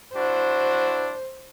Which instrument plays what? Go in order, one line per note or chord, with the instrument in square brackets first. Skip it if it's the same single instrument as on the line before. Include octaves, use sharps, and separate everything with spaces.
[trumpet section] D4 E4 F#4 [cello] C5